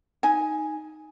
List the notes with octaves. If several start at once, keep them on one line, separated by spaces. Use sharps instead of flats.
D#4 G#5